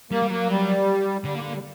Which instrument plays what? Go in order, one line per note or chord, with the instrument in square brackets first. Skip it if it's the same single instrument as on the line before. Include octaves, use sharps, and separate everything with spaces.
[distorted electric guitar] G3 [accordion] A#3
[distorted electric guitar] G3
[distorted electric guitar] F#3 [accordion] A#3
[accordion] G3
[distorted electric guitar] D3 [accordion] G3
[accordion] A#3
A#3
G3